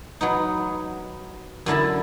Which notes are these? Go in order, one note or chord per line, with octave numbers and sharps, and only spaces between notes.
F#3 B3 D#4
F#2 D3 E4 A5